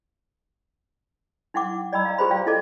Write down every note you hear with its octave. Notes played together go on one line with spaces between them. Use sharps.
D#4 E4 F#5 G5 D6
D5 D#5 G5 A#5 B5 E6
F5 A#5
F4 G4 G#4 B4 C5 B5
D5 F5 G5 A#5
E4 A4 D#5 A5 D6